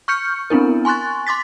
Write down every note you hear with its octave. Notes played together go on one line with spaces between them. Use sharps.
C#6 F6 G6 C#7
B3 C4 D4 E4 A#4
G#5 C6 C#6 F#6 A6
C6 D6 A6 B6